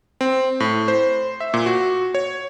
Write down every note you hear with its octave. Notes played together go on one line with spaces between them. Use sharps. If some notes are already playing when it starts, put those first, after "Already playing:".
C4
A2
C5
E5
A#2
F#4
C#5